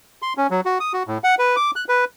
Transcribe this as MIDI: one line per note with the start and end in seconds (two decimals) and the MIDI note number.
0.22 0.33 84
0.37 0.47 61
0.50 0.61 54
0.65 0.78 66
0.80 0.93 87
0.93 1.03 66
1.08 1.18 45
1.24 1.35 78
1.39 1.56 71
1.56 1.71 86
1.76 1.84 90
1.89 2.05 71